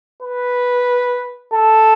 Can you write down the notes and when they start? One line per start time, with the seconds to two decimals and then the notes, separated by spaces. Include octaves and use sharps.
0.22 B4
1.52 A4